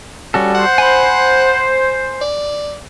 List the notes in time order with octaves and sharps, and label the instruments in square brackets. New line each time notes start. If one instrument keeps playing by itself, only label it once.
[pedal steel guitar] G3 F#4 A4 [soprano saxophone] C#4
[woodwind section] C5 [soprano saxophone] F#5
[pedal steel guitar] G#5 B5
[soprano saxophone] D5